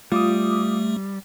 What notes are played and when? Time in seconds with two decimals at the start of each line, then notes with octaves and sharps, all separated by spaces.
0.12 G3 A3 F4 D6 D#6